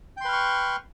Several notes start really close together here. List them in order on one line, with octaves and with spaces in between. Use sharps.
G5 C6 B4 F6 C#6